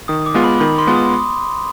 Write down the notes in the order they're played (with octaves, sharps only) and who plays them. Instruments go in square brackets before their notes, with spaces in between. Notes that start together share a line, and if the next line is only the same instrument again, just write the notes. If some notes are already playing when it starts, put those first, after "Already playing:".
[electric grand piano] D#3 [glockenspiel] D#6
[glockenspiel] D6
[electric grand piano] G#3 B3 F4
[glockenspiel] B5
[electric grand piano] D#3 [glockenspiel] B5
[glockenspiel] C6
[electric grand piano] G#3 B3 F4
[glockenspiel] D#6